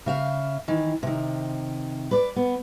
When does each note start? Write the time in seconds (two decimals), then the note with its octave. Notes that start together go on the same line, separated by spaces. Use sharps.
0.06 C#3 E5 F5
0.68 D#3 E3
1.03 C3 D#3
2.11 B4 D5
2.36 B3